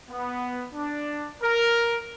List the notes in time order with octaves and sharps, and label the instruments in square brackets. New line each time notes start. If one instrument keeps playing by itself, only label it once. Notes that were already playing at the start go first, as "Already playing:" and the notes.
[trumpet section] B3
D4
A#4